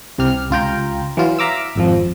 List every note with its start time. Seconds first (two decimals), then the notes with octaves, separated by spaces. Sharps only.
0.18 C2 C3 G4 F6
0.50 C#2 F4 G5 A#5
1.17 E3 F#3 F4
1.39 E5 F5 A#5 D6 E6
1.75 G#1 F2 F3